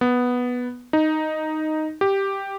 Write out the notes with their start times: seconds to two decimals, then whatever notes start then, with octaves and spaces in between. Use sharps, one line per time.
0.01 B3
0.93 D#4
2.01 G4